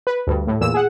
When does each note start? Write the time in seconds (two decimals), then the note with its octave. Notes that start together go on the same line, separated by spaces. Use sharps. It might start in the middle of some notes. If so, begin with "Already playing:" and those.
0.07 B4
0.27 D2 G2
0.47 A2
0.61 E2 A#2 E6 E7
0.74 G#4 F#5